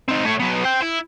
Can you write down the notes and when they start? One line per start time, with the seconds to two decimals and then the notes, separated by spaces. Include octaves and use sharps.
0.08 C4 D#4
0.25 A3 C#5
0.40 F#3 B3
0.64 C5 G5
0.82 E4